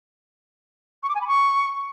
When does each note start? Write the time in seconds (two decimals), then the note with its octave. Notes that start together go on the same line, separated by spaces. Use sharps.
1.02 C#6
1.08 D6
1.15 G#5
1.21 B5
1.27 C#6